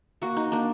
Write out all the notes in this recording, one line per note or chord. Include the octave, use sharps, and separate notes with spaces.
A#3 F#4
D#4
A#3 D4